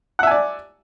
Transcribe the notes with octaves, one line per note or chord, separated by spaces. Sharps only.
D5 E5 F#5 G#5